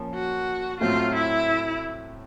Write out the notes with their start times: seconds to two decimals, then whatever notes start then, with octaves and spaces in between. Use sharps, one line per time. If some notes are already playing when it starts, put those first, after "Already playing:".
Already playing: A#2 F3 A#3 C#4
0.14 F#4
0.80 A2 F#3 A3 C4 F4
1.14 E4